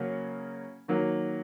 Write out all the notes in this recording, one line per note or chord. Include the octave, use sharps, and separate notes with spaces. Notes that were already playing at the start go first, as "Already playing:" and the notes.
Already playing: C#3 F#3 A#3 C#4
D#3 F#3 A#3